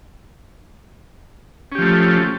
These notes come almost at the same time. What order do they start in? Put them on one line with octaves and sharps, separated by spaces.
C#4 G4 F3 A3